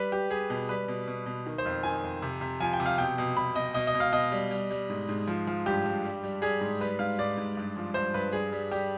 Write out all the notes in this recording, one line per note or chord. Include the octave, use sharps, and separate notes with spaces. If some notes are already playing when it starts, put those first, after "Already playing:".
Already playing: G3 B4
G3 G4
G3 G#4
B2
G3 B4
B2
B2
B2
D#3
C5
F2
D#3 G#5
F2
C3
C3
F3 G#5
G5
C3
F5
B2 G5
B2
B2 B5
B2 D#5
B2 D#5
D#5
B2
F5
B2 D#5
G3
G3
G3
G#2
G#2
F3
F3
G2 G4
G2
G3
G3
G3 G#4
G#2
G3 B4
G#2 F5
G#2 D5
G#2
G2
F3
G2 C5
G2 B4
G3 G#4
G3
G3 G4